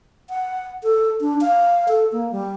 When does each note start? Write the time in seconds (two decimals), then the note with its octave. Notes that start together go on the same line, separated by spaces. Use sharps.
0.30 F#5
0.83 A4
1.21 D4
1.41 F5
1.88 A4
2.12 A#3
2.32 G3